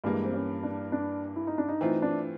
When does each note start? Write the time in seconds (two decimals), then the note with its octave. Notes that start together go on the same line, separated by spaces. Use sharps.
0.04 G2 E3 G3 G#3 A#3
0.24 C4
0.34 C#4
0.63 D4
0.92 D4
1.36 E4
1.47 D#4
1.58 D4
1.69 D#4
1.81 E3 A3 C4 D#4 F4
2.02 D4